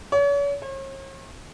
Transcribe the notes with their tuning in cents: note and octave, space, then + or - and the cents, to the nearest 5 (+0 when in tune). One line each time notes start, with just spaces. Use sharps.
C#5 +40
C#5 -45